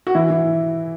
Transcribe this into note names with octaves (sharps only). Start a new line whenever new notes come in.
F#4
E3 E4
E3